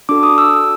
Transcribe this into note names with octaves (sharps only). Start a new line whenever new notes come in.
D4 F#4 A4 D6
D#6
E6